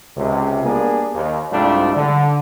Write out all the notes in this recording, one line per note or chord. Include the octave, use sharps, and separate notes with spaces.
C#2 C3
G3 A#3 B3 D4 G#4
D#2
C2 G#2 G3 A3 D4 F4
D3